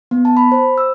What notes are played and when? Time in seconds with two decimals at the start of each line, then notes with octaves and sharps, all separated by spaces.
0.11 B3
0.25 A5
0.37 B5
0.52 C5
0.78 E6